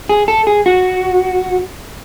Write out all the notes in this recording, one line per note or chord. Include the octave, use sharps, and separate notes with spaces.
G#4
A4
G#4
F#4